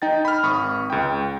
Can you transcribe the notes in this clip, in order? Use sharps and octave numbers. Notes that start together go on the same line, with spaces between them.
D#4 G5 A6
B5 F6
G#1 B5 C#6 D#6
C#2 G5